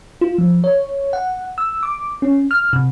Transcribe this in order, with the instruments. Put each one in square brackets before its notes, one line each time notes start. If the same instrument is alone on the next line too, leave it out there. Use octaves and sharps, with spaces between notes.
[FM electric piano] F4
F3
C#5
F#5
E6
D6
C#4
F6
C3